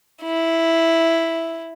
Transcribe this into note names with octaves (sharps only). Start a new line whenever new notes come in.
E4